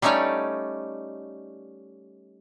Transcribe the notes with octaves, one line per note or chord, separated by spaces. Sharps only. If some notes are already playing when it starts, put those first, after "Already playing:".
G3 A3 C#4 D#4 C#5 D5